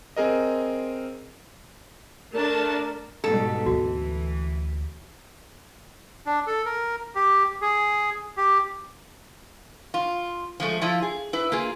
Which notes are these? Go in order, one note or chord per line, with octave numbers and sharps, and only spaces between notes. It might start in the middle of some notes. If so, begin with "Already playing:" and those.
C4 G#4 A#4 D#5
A3 D4 A#4 A5
G#2 B2 G3 A4
D2 E3 F#4
D4
A4
A#4
G4
G#4
G4
F4
F3 G#3 A3
F3 E4 F4
G#4
E4 B4
A#3 F4 G#4